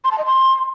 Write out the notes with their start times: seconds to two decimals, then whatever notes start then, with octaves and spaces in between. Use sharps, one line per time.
0.04 C6
0.11 A5
0.18 D#5
0.25 C6